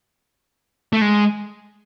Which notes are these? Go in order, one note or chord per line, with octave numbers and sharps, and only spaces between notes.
A3
G#3